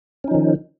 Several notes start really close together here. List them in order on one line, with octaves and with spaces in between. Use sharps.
C#4 D#4 F3 D#3